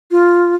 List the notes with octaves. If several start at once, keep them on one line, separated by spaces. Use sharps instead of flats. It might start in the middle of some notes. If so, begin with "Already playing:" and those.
F4